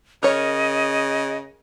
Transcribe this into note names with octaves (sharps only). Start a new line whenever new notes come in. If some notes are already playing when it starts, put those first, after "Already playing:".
C#3 A#4 C#5 D#5